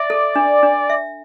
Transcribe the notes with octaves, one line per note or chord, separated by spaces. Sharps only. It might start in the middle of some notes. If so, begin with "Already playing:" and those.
Already playing: D5 E5
A4
D4
D4
E5